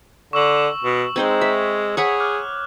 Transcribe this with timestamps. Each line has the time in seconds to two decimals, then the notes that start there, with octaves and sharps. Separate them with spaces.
0.33 D3 C#6 E6 F#7
0.84 B2
1.16 G#3 C4 D#4 C5 G#6
1.41 E5
1.97 G#4 C#5 F#5 B5
2.20 D6 F6 F#6